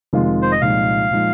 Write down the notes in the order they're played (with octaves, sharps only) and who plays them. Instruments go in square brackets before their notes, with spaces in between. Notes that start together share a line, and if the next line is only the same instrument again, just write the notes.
[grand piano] F1 F2 D#3 G#3 F4
[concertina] C5
D#5
[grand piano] C2 A#2 F3 G#3 D#4 [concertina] F5
[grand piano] A#2 F3 G#3 D#4